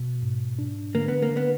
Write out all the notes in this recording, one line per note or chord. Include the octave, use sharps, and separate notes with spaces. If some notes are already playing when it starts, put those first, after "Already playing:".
Already playing: B2
G#2
D4
D3 A#3
B3
A#3
D3
B3